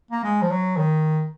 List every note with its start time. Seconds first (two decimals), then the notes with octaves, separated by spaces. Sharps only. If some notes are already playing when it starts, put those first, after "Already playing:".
0.11 A#3
0.24 G#3
0.42 F3
0.51 F#3
0.77 D#3